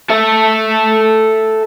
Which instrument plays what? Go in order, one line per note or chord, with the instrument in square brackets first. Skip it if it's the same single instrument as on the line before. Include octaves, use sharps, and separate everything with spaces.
[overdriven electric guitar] A4 E5